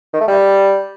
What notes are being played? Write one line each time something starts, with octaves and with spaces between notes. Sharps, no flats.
D#3
A3
G3